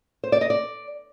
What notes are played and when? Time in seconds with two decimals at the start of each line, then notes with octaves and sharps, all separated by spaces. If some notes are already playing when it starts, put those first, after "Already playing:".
0.24 C5
0.32 D5
0.41 D#5
0.50 D5